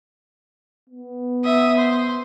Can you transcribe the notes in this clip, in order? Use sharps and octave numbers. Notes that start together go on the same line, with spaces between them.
B3
E5 D#6
C5